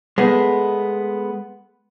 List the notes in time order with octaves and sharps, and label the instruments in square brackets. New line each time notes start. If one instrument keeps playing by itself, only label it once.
[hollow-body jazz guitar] G#3 A3 B3